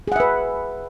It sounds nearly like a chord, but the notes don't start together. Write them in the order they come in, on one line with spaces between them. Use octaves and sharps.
G#4 F#5 E5 B4